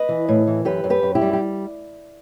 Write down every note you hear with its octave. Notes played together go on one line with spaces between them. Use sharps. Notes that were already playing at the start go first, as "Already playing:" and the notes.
Already playing: B4 D#5
E3
A2
E3
F#2 G4 B4
F#2
G4 B4
F#2
E4 G4
G3
G4